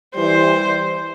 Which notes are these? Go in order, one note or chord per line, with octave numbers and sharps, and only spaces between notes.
E3 G3 C5